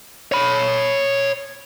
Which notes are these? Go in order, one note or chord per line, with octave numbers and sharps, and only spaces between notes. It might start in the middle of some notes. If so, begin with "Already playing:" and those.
C#5 B5